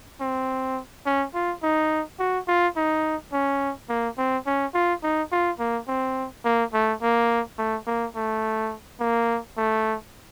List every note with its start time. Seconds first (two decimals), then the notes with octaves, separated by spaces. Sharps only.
0.21 C4
1.06 C#4
1.34 F4
1.63 D#4
2.19 F#4
2.48 F4
2.76 D#4
3.33 C#4
3.89 A#3
4.18 C4
4.46 C#4
4.74 F4
5.03 D#4
5.31 F4
5.59 A#3
5.88 C4
6.45 A#3
6.74 A3
7.02 A#3
7.58 A3
7.87 A#3
8.15 A3
9.00 A#3
9.57 A3